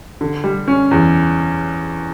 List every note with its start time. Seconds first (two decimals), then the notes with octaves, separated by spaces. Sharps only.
0.21 D3
0.44 G3
0.68 C#4
0.91 E2